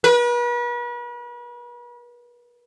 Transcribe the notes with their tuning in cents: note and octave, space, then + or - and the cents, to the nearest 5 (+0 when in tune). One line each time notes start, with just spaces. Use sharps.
B4 -40